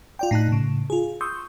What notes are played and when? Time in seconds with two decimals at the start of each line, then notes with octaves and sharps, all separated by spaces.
0.19 F4 D5 G5
0.31 A2 D#4 A5 F#6
0.49 A2 C#3
0.90 F4 G#4
1.21 C6 C#6 D#6 E6 G6